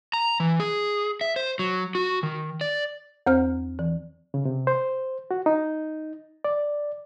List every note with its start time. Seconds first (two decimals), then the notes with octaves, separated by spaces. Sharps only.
0.13 A#5
0.40 E3
0.60 G#4
1.21 E5
1.36 C5
1.59 F#3
1.95 F#4
2.23 D#3
2.61 D5
3.27 E2 C4 C5 F6
3.79 E3
4.34 C#3
4.45 C3
4.67 C5
5.31 F#4
5.46 D#4
6.44 D5